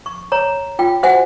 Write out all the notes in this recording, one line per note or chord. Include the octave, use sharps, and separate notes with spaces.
C#6
C#5 A#5
F4 G5
F#4 C5 E5 F#5 G#5